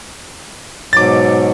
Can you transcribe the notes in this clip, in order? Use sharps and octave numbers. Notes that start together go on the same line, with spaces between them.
G#2 B2 F#3 D6 A6